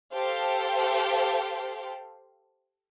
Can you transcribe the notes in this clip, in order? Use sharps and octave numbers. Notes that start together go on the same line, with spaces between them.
G4 A4 C5 F5